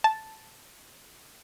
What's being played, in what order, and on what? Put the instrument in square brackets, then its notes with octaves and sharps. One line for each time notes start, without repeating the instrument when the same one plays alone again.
[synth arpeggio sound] A5